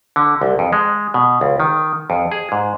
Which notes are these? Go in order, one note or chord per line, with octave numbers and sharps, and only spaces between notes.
D3
C2
F2
G#3
B2
C#2
D#3
F2
G#4
G#2